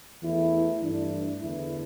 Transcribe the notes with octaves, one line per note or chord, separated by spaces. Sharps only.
E2 E3 A3 E4
G2 E3 A3 D4
E2 D3 A3 E4